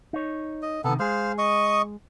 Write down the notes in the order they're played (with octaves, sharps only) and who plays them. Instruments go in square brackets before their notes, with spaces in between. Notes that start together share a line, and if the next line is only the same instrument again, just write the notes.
[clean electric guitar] D#4 C#5
[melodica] D#5
[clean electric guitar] C3 D#3 [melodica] B3 A4
[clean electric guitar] G#3 G#4 [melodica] C5 F5
[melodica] D#5 C#6 D#6